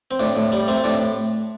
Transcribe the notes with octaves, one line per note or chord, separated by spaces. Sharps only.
C4
A2 D4
A2
G3
A3 C4
A2 D4